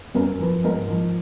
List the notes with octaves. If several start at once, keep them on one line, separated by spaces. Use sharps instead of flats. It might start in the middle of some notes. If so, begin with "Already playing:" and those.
F#2 A#4
F3 B4
G#2 A#4
F3